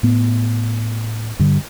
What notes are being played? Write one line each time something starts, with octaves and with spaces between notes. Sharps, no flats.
A2 B3
G2 D3